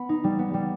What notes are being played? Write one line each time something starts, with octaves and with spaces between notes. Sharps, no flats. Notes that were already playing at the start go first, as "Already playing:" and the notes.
Already playing: B3 B5
D#4
G3
B3
G3